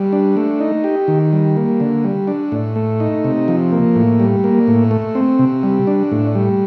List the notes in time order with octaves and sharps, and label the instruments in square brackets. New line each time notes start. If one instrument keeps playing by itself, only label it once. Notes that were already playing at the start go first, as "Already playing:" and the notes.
Already playing: [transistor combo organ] G3
D4
A3
D#4
G4
D#3
G3
A#3
D3
G3
D4
A2
A3
D#4
C3
F3
A#3
A2
G3
A#3
A2
A3
C4
C3
G3
D4
A2
G3